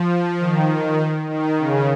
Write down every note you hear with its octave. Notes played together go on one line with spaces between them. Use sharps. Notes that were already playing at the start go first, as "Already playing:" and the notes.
Already playing: F3
D#3
D#3
C#3